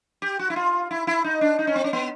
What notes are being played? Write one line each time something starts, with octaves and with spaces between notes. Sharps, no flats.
G4
F#4
E4
F4
E4
E4
D#4
D4
D#4
C#4
C4
C#4
B3